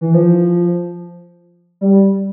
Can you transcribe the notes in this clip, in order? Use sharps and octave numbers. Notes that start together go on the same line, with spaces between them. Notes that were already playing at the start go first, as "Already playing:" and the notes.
E3
F3
G3